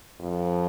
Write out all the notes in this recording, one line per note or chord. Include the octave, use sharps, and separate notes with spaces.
F2